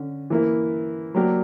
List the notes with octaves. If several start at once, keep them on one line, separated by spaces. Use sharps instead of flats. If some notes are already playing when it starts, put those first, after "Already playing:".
Already playing: D3 C#4
E3 A#3 E4
F#3 A#3 D4 G4 A#4